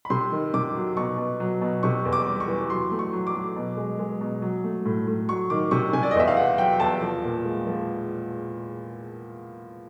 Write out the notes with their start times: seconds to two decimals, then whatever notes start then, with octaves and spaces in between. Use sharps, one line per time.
0.05 B5
0.10 C3 C6
0.32 D#3
0.54 C3 D6
0.75 F#3
0.97 B2 C#6
1.18 B2
1.40 F#3
1.61 B2
1.83 C3 C#6
2.05 E2
2.13 D6
2.26 G3
2.40 C#6
2.48 E3
2.69 F#3 C6
2.91 A3
2.99 C#6
3.13 F#3
3.27 D6
3.34 F#3
3.56 B2
3.77 G#3
3.99 G#3
4.21 B2
4.42 F#3
4.64 A3
4.86 A2
5.07 A2
5.29 F#3 C#6
5.50 D#3 D6
5.71 C3 C#6
5.93 C3 G#5
6.03 D5
6.11 D#5
6.15 E2 E5
6.28 F5
6.37 E2 F#5
6.58 F#3 G5
6.80 E2 A5
7.02 F3
7.24 A#2
7.45 G#3
7.67 F3